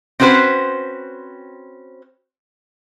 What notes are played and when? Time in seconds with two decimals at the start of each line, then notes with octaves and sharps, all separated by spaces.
0.20 C4 C#4 F#4 B4 C5